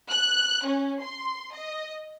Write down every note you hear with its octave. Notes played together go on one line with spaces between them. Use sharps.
F#6
C#4
C6
D#5